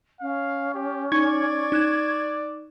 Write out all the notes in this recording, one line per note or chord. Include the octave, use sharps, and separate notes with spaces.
C#4 F5
G4
D#4 D5 G#5 C#6 G#6
D#4 F#6 E7